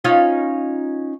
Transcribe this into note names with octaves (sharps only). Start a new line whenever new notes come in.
C#4 D#4 F4